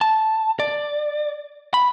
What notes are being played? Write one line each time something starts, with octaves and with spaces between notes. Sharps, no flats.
A5
D5
B5